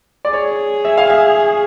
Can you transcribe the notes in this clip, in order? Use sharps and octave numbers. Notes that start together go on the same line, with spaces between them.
D5
G#4 C#5
E5
F5
E5